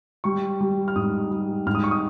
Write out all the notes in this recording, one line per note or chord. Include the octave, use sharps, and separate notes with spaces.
G3 C#6
G3
F6
G#2 D#6
G3
G#2 F6
D#6
C#6
D#6